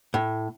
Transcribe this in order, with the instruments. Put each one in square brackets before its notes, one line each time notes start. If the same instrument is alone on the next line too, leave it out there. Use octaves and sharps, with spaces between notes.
[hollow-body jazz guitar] A2